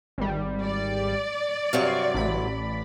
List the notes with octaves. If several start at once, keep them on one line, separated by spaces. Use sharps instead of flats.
G#1 G3
D5
G2 C3 F#3 F5 C#6
A1 B5